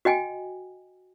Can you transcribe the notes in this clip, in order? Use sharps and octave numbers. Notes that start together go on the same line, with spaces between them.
F#4 D#5 G5 G#5